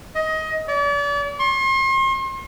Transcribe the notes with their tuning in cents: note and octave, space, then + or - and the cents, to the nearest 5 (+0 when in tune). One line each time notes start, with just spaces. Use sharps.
D#5 +20
D5 -40
C6 +40